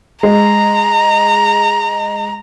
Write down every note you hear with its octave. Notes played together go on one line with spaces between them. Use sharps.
G#3 A#5